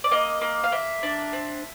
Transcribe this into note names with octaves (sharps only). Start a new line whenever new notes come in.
D5
A#3 D#5
A#3
F5
A#3 E5
D4
C4